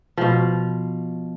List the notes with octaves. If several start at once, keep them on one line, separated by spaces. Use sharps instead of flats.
B2 F3